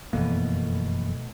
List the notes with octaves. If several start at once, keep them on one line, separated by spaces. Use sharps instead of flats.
F#1 F2 B2 E3 A3 A#3